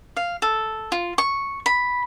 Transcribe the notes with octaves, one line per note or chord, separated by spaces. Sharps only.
F5
A4
F4
C#6
B5